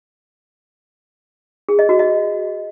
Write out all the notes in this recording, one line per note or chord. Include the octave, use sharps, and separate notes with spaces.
G#4
D#5
F#4
D#5